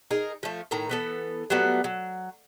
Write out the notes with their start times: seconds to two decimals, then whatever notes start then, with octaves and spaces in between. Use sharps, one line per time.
0.11 D#4 G#4 A#4
0.43 F3 A3
0.71 A2 D#3 A#5
0.89 E3 B3 A4
1.50 F#3 G3 A3 B3
1.84 F#3